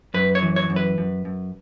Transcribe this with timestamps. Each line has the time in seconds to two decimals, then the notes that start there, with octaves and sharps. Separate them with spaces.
0.14 F#2 B4
0.35 C#5
0.42 E3
0.56 C#5
0.70 F#2
0.76 B4
0.98 F#2
1.25 F#2